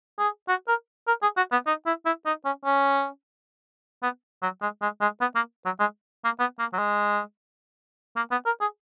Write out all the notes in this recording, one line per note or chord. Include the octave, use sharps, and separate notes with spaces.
G#4
F#4
A#4
A#4
G#4
F#4
B3
D#4
E4
E4
D#4
C#4
C#4
B3
F#3
G#3
G#3
G#3
B3
A#3
F#3
G#3
A#3
B3
A#3
F#3
G#3
A#3
B3
A#4
G#4